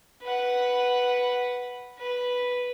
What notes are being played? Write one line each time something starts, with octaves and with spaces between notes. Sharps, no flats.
B4 F#5
B4